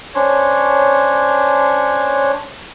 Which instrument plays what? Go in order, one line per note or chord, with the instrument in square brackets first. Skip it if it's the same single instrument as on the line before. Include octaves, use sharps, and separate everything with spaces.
[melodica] C#4 D4 C5 C#5